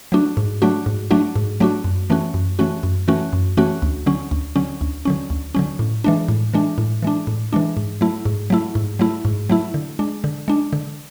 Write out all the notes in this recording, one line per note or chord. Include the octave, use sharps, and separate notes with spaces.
F#3 A3 D4 F#4
G#2
F#3 A3 D4 F#4
G#2
F#3 A3 D4 F#4
G#2
F#3 A3 D4 F#4
F#2
E3 A3 C#4 F#4
F#2
E3 A3 C#4 F#4
F#2
E3 A3 C#4 F#4
F#2
E3 A3 C#4 F#4
D2
D3 F#3 C#4
D2
D3 F#3 C#4
D2
D3 F#3 C#4
D2
D3 F#3 C#4
A2
E3 G#3 D4
A2
E3 G#3 D4
A2
E3 G#3 D4
A2
E3 G#3 D4
G#2
F#3 A3 E4
G#2
F#3 A3 E4
G#2
F#3 A3 E4
G#2
F#3 A3 E4
D3
G#3 D4
D3
G#3 D4
D3